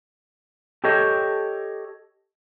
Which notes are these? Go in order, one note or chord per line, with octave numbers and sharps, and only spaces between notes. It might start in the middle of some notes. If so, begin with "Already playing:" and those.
G4 A4 C#5 D#5 G5